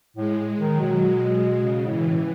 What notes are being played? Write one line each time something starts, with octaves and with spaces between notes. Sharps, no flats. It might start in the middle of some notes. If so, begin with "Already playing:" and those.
A2 G#3
G#3
D#3
F#3
B2
G#3
G#3
C#3
A2 E3
A2